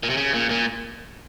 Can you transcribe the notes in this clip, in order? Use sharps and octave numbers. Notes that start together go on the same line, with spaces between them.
A#2
C3
C#3
A#2
A#2